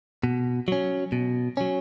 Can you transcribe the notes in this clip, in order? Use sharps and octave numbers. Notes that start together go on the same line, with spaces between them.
B2
F#3 C#4
B2
F#3 C#4